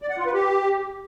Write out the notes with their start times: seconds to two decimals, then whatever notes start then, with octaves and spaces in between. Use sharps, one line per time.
0.02 D5
0.10 F#5
0.18 F4
0.26 B4
0.34 G4